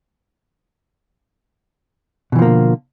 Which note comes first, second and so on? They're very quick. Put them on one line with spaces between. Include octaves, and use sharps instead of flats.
B2 E3 F3 A#3 D3